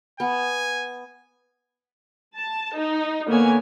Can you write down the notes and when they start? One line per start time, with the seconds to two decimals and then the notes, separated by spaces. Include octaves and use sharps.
0.20 B3 G#5
2.36 A5
2.77 D#4
3.28 D3 A#3 B3 C#5 G#5